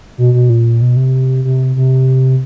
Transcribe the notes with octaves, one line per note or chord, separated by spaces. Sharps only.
B2
B2
A#2
B2
C3
C3
C3